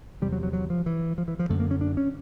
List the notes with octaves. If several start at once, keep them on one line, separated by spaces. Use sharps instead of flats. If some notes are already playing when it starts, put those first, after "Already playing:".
E2 C3 G3
F#3
F#3
F#3
F3
E3
F3
E3
F3
F#2 D3 A3
A#3
C#4
D4
C#4